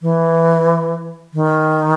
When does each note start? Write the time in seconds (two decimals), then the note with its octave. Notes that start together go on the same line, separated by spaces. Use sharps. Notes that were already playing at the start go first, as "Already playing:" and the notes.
0.02 E3
1.34 D#3